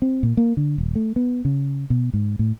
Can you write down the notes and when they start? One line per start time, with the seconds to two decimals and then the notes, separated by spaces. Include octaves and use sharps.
0.02 C4
0.23 A#2
0.37 A#3
0.57 D3
0.78 D#1
0.95 A3
1.16 B3
1.45 C#3
1.90 B2
2.14 G#2
2.39 A2